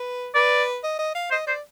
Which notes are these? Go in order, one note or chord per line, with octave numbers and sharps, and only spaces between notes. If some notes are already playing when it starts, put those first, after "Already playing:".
Already playing: B4
B4 D5
D#5
D#5
F5
C5 D#5
C5 D5